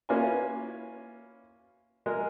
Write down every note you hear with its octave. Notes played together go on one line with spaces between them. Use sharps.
A#3 C#4 E4 F4 B4 G#5
G#3 A#4